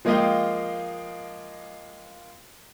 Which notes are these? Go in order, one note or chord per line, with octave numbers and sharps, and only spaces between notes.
F3 G#3 A#3 F4 D#5 G5